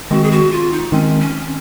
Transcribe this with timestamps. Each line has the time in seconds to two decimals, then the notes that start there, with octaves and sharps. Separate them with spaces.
0.11 D#3 G#3 C4 F#4
0.23 G#4
0.31 F#4
0.52 F4
0.72 D#4
0.92 D#3 G#3 C4 C#4
1.20 C#4